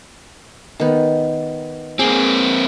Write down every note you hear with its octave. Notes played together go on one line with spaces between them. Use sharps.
D#3 B3
A#3 C4 G#4 D6